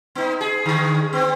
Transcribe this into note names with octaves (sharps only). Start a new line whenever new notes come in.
B3 D#4
G#4
D3 G#4
B3 C4